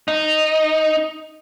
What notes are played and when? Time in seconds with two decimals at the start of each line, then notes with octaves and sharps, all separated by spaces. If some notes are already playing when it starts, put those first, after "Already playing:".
0.08 D#4